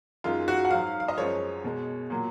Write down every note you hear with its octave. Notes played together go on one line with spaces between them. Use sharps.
F#2 D#3 G#3 F4
F#4
F#5
G#2 F#3 F5
F5
D#5
F#2 F3 G#3 C#5
B2 G#3
A#2 F#3